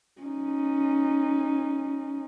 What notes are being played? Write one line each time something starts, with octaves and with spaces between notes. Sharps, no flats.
C#4 D#4